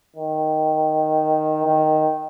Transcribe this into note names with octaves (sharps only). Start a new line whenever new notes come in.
D#3
D#3